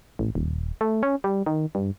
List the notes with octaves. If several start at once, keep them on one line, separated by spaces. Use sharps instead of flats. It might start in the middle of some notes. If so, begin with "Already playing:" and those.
A1
D#1
A3
C#4
G3
D#3
G2